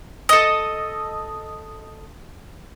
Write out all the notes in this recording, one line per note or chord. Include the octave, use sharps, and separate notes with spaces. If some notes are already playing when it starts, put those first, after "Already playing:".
A4 D#5